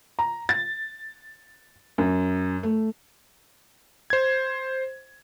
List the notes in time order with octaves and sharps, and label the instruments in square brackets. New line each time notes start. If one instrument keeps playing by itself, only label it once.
[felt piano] A#5
A6
F#2
A3
[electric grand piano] C5 G#6